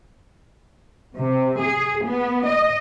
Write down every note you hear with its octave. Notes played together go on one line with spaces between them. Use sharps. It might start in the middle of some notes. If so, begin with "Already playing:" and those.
C3
G#4
B3
D#5